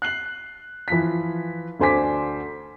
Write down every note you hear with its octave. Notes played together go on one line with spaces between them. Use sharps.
F#6 C7 F#7
E3 F3 B6
D2 D3 C5 G#5 D6 B6